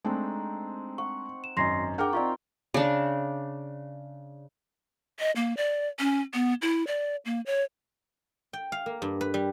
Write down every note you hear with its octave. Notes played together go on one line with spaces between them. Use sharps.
G#3 A3 C4 D4 D#4
F#5 C#6
E7
G#1 F#2 D#5 C6 A#6 C7
D4 G#4 A#4 F#5 G5 D6 F6
C4 D#4 F4 D5 F5 C#6
C#3 D4
D#5
A#3
D5
C#4
B3
E4
D5
A#3
C#5
G5
F5
A#3
G2
B4
G3